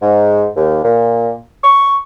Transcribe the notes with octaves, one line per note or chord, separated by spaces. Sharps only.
G#2
D#2
A#2
C#6